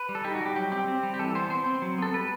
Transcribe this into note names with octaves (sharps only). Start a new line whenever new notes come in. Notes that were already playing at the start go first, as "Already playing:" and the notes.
Already playing: B4
G3
A4
D#4 G4
F#4
G3
G4
F#3 G4
C4 G4
C4
G3
G4
E3 A4
B3 C5
C4 C5
C4
F#3
B3 A4
G3 B4